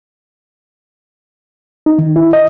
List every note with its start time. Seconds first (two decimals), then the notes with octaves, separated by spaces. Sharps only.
1.86 D#4
1.99 D#3
2.16 E4
2.33 D#5